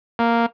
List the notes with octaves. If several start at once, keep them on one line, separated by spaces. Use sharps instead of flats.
A#3